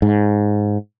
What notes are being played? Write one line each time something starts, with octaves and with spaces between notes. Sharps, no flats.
G#2